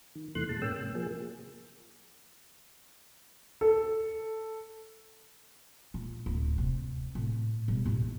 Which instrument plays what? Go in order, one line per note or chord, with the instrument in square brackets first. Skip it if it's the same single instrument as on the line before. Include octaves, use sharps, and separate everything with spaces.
[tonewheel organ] D#3
E2 C3 E3 A3 C6 F#6
A#2 G#3 A5
G#2 A#3 C#4 G5 E6
C3
F3 A#3 G#4
[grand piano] A4
[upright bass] A#2
D1
C3
A2
B2 G3
A1 D#2